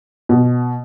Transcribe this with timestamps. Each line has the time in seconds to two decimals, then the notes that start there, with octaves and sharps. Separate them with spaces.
0.29 B2